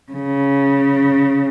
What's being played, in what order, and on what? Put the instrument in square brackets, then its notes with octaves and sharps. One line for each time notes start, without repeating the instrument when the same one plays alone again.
[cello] C#3